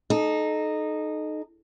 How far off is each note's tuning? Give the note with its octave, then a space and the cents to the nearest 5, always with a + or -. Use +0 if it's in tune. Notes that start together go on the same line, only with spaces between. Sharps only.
D#4 -15 A4 -35